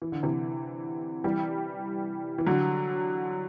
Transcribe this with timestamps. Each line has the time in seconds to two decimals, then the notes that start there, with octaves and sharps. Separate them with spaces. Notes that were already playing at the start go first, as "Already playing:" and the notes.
0.02 E3
0.12 D3
0.23 C3 E3
1.24 E3 G3
2.38 E3
2.47 D3 F#3